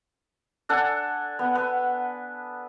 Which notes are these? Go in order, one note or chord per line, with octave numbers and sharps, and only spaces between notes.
D4 A4 F#5 G#5
B3
B3